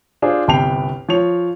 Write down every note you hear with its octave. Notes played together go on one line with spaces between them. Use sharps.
D4 F4 G#4 C5
G1 C2 B4 G5 C7 F7
F3 C#5 F7